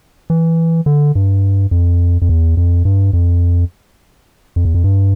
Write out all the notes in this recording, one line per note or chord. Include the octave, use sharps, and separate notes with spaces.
E3
D3
G2
F2
F2
E2
F2
G2
F2
F2
E2
F2
G2